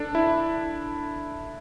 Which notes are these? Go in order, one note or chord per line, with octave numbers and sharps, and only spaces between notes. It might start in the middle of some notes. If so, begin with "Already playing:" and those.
Already playing: D4 A4
E4